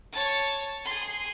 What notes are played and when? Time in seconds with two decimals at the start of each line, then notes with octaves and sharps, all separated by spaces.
0.12 C#5 A5
0.85 G#4 C6